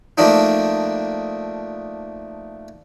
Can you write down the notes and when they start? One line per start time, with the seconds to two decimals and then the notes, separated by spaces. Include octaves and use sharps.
0.18 F3 A3 A#3 D4 D#4